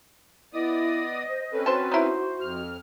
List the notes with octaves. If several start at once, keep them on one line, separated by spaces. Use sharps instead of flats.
B3 E4 D5 D#5 D#6
C5
C4 C#4 A4 B4
F#4 C5 A5
D#4 E4 C5
F2 F6